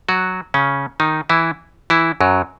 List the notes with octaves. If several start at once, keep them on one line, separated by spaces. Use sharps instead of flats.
F#3 F#4
C#3 C#4
D#3 D#4
E3 E4
E3 E4
F#2 F#3